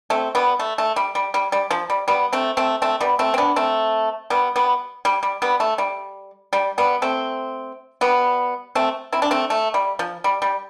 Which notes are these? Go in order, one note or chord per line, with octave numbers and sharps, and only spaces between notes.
A3 C4
G3 B3
A3
A3
G3
G3
G3
G3
F3
G3
G3 B3
A3 C4
A3 C4
A3 C4
G3 B3
A3 C4
C4
B3 D4
A3 C4
G3 B3
G3 B3
G3
G3
G3 B3
A3
G3
G3
G3 B3
A3 C4
G3 B3
A3 C4
C4 E4
D4
A3 C4
A3
G3
F3
G3
G3